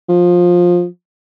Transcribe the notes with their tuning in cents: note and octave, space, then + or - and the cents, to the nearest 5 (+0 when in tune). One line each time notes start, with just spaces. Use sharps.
F3 +15